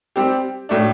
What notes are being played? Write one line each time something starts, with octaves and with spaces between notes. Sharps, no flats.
G3 C4 G4
A2 F#3 A3 D4